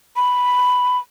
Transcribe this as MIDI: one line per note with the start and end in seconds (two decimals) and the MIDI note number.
0.16 0.98 83